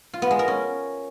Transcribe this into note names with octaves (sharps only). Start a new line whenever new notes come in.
F4
B3
G#3
A#4
C#4